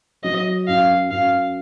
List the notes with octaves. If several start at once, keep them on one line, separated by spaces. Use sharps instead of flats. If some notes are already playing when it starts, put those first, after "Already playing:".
F#3 D#5
F#2 F5
F#2 F5